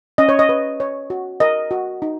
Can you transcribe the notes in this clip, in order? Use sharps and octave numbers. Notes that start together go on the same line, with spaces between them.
C#4 D#5
C#5
D#5
B4
C#5
F#4
A#4 D#5
F#4
D#4